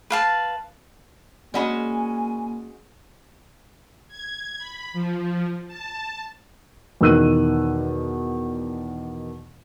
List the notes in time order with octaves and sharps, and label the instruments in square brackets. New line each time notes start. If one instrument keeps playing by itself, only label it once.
[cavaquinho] B4 F5 A5
[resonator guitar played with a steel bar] G#3 C#4 F#4 [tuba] A#3 [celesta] D5 F#5 B5 [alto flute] G#5
[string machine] G#6
B5
F3
A5
[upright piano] E2 B2 D#3 E6 F#6 D#7